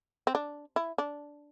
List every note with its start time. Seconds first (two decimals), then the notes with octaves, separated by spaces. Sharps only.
0.27 C4
0.35 D4
0.76 E4
0.98 D4